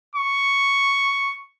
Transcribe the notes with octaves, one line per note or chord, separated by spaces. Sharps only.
C#6